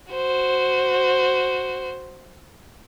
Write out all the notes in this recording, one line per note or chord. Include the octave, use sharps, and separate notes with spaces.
F#4 C5